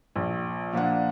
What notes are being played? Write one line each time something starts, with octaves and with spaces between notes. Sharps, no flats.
A#1
A#2 F3 D4 F#5